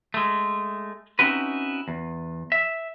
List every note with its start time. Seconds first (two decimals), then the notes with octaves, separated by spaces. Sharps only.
0.14 G#3 A3
1.19 C4 C#4 D#4 E4 F#4 B4
1.88 E2
2.52 E5